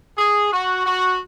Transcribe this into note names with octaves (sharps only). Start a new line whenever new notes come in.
G#4
F#4
F#4